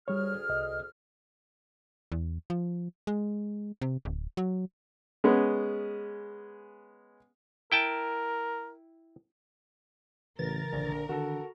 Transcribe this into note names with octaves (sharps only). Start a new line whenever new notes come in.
D2 G3 G#4 C#5 F6
C2 D#5
E2
F3
G#3
C3
D1
F#3
G#3 B3 C#4
E4 A#4 G5 A5
A1 C#3 E3 A#4 A6
A#1 D3
D3 D#3 F#4 A4